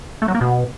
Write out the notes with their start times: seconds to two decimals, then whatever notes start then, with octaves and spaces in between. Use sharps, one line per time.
0.22 A3
0.28 F#3
0.35 A#3
0.41 B2